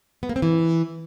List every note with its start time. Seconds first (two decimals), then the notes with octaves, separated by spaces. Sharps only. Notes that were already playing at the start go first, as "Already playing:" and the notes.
0.23 B3
0.29 A#3
0.36 C4
0.42 E3